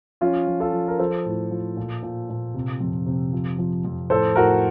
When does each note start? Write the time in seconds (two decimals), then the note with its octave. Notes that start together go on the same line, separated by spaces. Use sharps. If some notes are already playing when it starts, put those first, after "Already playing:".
0.21 F3 C#4 F4
0.47 F3
0.60 F4 A4
0.73 F3
0.88 A#4
0.99 F3 A4 C5
1.26 A2
1.51 F3
1.76 A#2
2.03 A#2
2.29 A#2
2.54 C3
2.81 F2
3.06 C3
3.33 F3
3.58 F3
3.85 F2
4.10 A2 A4 C5
4.36 A2 F#4 A#4